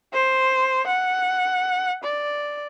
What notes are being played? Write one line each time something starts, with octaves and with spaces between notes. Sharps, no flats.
C5
F#5
D5